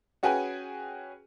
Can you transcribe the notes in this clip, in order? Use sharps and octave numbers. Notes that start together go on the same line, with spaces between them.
C#4 F#4 G#4 B4 G5 G#5